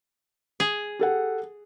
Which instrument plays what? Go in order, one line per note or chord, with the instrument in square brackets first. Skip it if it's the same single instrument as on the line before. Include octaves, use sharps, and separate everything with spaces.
[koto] G#4
[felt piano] G4 A4 F#5